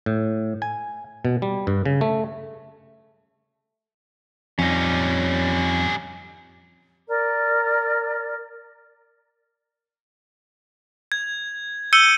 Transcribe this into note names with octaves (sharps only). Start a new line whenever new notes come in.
A2
G#5
B2
G3
G2
C#3
A3
F2 G3 C#4 D#4
A#4 D5
G#6
E6 G6 C#7 D#7 G7